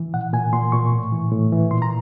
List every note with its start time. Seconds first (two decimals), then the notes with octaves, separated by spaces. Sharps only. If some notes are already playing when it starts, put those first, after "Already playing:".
Already playing: E3
0.13 A#2 F#5
0.33 A#2 G#5
0.53 A#2 C6
0.72 A#2 C#6
0.92 A2
1.12 E3
1.32 A2
1.52 E3
1.71 A#2 C6
1.82 A#5